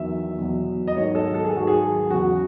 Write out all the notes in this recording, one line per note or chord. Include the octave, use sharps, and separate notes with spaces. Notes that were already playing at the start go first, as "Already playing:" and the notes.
Already playing: E2 D#3 F#3 E5
E2 B2 F#3
D#5
G#2 D#3 F#3 C#5
A4
A4
G#4
G#2 D#3 F#3 F#4
G#4
E2 C#3 F#3 F#4